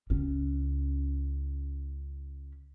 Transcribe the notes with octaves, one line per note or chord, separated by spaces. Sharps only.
C#2 C#4